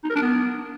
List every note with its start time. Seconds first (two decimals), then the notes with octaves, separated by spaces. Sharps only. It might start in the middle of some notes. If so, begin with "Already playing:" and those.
0.04 D#4
0.10 A#4
0.16 D4
0.22 B3